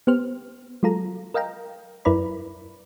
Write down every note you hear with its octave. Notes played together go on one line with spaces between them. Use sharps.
B3 G4 C5 F6
F#3 G#3 F4 A4 A#5
A#4 D#5 F5 G5 A#5
F#2 E4 A#4 B4 D5 B5